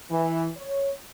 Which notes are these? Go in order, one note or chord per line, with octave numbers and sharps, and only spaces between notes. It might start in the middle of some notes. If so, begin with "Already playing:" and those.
E3
C#5